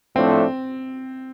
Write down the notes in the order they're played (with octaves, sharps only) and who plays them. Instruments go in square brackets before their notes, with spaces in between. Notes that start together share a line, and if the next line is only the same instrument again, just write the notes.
[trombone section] A2 F3 A3 D4 [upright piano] C4